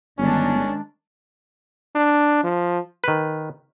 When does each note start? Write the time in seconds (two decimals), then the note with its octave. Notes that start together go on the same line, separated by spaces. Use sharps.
0.18 G1 D#3 G#3 C#4 D4
1.95 D4
2.44 F3
3.04 D#3 B4